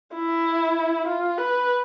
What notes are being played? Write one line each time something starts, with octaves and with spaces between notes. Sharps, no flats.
E4
F4
B4